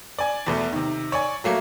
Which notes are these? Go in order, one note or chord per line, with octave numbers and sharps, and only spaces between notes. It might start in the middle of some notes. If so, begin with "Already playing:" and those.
D5 G#5
E2 B2 A3
C3 D#3
C#5 D5 G#5
F#3 A3 A#3